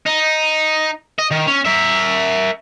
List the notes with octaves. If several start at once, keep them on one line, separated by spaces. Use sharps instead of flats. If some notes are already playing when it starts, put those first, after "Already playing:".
D#4
D#5
D#3
C#4
A#4 E5